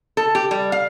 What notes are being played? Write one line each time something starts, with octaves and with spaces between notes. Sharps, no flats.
A4
G4
G3
F5